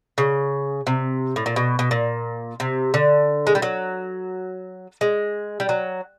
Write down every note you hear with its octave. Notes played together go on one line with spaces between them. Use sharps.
C#3
C3
A2
A#2
B2
B2
A#2
C3
D3
G#3
G3
F#3
G#3
G3
F#3